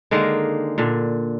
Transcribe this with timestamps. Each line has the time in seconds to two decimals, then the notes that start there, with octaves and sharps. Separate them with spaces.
0.11 D3 D#3 G#3 A#3
0.78 A#2 D3